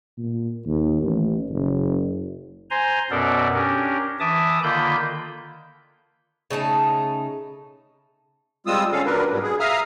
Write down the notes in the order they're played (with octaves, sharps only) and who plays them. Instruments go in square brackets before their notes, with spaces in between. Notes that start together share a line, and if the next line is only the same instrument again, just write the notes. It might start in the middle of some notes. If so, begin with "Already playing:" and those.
[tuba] A#2
D#2
A1
F#1
[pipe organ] C5 G#5 A#5 C6
F#2 B2 B3 A4 A#4 D5
C#4 D4 G4 A#4
E3 E5 A5 D6 D#6
D3 D#3 A#3 F4 B5 G6
[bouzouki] C#3 A3 D#4 A5
[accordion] G3 G#3 C4 F4 D#6 E6
D3 C#4 A4 F5
A#2 F#3 D4 A#4 B4
G#2 B2 G3
G#4
E5 F5 A#5 D#6 F6